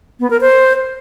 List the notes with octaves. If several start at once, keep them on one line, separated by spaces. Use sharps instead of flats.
B3
A#4
C5